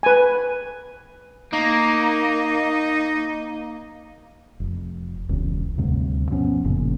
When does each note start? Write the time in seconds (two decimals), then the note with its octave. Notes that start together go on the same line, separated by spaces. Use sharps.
0.03 B4 G#5
1.53 A#3 D#4
4.60 F1
5.29 E1 C#2
5.78 D2 G2 C3
6.30 B2 F3 B3 C#4
6.64 F#1 F2 A#2 C#3